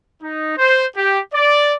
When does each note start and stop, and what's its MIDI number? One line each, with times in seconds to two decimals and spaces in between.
0.22 0.56 63
0.58 0.84 72
0.97 1.20 67
1.34 1.75 74